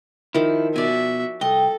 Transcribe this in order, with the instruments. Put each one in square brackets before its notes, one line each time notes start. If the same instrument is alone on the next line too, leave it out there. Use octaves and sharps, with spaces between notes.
[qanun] D#3 F3 [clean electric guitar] E4
[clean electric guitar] B2 [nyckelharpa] F#4 E5 [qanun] D5 G#5
[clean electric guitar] C2 [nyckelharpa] A4 [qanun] D#5 [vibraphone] G5